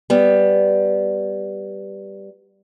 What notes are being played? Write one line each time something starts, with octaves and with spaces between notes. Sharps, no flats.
G3 B3